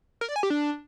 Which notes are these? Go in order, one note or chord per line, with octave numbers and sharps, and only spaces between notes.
A#4
D5
G#5
G4
D4